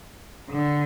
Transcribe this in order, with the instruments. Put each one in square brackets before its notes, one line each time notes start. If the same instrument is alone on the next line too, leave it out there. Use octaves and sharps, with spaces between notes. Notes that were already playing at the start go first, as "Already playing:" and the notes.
[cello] D3